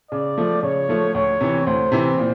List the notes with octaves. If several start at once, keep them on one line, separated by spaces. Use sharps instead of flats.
C#3 D5
F3 A3
C#3 C#5
F3 A3
D2 C#5
C3 E3
D2 C5
C3 E3
A#2